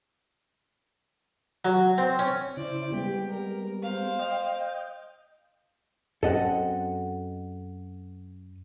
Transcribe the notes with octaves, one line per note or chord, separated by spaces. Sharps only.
F#3
C4
C#4
C#3 E4 C5 D5
G3 G#3 B3 G4
A#4
C5 F5
D#5 G5
F#2 C4 A4 D#5 F#5